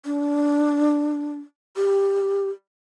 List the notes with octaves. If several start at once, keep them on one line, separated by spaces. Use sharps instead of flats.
D4
G4